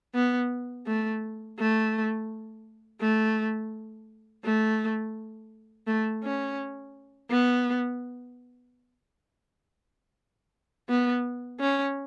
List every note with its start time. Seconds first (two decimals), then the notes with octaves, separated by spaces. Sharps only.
0.14 B3
0.86 A3
1.59 A3
3.01 A3
4.44 A3
5.87 A3
6.24 C#4
7.30 B3
10.89 B3
11.60 C#4